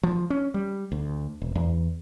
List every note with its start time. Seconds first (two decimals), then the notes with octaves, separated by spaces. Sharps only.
0.03 F3
0.30 C#4
0.54 G3
0.92 D2
1.42 E1
1.55 E2